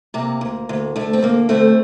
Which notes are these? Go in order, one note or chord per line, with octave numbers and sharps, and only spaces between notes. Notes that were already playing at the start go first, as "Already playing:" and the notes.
C3 A#3
D2
D2
D2 A3
C4
D2 A#3
D2 A3 C4